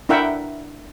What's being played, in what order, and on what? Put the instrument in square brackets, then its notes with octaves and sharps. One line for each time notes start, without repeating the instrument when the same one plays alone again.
[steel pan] D4 E4 A#4 E5 F#5 G5